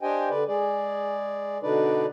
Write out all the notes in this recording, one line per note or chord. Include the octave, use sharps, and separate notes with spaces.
D4 G4 C5 D#5 G5 G#5
D3 B4 D5
G#3 G#4 D5
B2 D3 D4 D#4 B4 D5